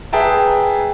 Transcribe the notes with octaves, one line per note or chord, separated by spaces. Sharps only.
G#4 B4 E5 G5 A5 A#5